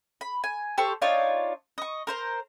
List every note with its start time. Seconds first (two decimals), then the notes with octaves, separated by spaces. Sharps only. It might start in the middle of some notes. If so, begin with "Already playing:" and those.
0.21 B5
0.44 G#5
0.78 G4 A4 C5 C#6
1.02 D4 D#4 F4 C#5
1.78 D#5 C#6
2.07 A#4 C5 A#5